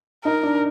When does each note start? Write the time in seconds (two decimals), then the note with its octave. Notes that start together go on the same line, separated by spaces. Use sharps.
0.25 D#4 A#4
0.43 D4